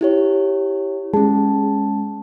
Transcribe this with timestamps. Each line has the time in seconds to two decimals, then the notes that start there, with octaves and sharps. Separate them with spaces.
0.01 E4 G4 C#5
1.13 G#3 C#4 A5